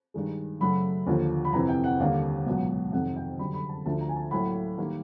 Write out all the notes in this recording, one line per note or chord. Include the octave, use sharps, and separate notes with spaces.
G2 D#3 G#3
F#2 C#3 F#3 A3 B5
D#2 D3 F3 A#3
B5
F2 C3 E3 A#5
G5
F#5
D#2 D3 G3 A#3 F5
C#2 B2 F#3
F2 C3 D#3 F#5
G5
F#2 D3 G3 B5
B5
A5
D2 D3 F3 A3 A5
A#5
G#5
A5
A2 F#3 A#3 B5
D#3 G3 A#3